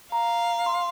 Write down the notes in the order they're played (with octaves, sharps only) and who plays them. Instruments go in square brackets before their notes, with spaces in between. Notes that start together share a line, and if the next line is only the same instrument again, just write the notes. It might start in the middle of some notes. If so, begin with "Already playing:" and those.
[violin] F5 [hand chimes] A#5
[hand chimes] C6